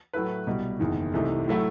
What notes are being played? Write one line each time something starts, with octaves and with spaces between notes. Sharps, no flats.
A2 F#3 A3 E4 B4
C2 B2 G3
F#1 E2 D#3
C2 C3 E3 A3 D#4
A2 F#3 A3 E4